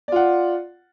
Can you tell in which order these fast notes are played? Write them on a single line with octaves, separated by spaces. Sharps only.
D5 F4 F#5